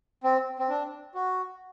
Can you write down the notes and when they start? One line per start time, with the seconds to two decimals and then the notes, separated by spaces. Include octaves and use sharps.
0.24 C4
0.59 C4
0.69 D4
1.14 F#4